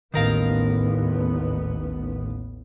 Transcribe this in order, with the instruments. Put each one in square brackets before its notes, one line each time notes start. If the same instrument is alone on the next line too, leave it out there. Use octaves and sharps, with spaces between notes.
[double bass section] A1 D#2 B3 [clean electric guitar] D#3 A#4 F5